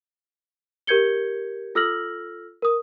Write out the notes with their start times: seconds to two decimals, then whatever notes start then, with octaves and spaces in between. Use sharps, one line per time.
0.87 G4 A#4 G6 G#6 C#7 G7
1.75 F4 A4 E6 F6 A#6 F#7
2.62 A#4 D#6